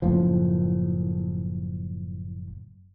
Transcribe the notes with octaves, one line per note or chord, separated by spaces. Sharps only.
F#1 A2 F3